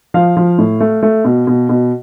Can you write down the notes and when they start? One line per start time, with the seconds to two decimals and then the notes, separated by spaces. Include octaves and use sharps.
0.14 F3 F5
0.37 F3
0.58 A2
0.80 A3
1.03 A3
1.25 B2
1.47 B2
1.69 B2